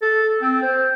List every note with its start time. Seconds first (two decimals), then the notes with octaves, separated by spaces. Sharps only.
0.02 A4
0.41 C4
0.62 C5